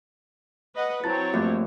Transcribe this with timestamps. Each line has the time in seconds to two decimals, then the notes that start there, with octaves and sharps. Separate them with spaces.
0.75 B4 D#5 F#5
1.04 F#3 C4 E4 C#5 A5 A#5 A6
1.34 G2 F3 A3 A#3